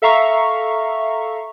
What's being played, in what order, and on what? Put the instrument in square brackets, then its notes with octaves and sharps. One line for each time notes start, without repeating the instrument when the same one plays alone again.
[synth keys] A4 E5 F5 A#5 C#6